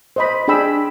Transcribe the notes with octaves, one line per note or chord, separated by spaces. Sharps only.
C5 D#5 B5
D4 G#4 G5 B5 E6